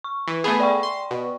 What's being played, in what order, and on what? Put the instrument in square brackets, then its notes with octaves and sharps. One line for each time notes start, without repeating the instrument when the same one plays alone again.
[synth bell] C#6
[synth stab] E3
[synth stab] A3 B3 G#4 [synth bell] G#5 B5
[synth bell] D5 G5 C#6
[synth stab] C6
B2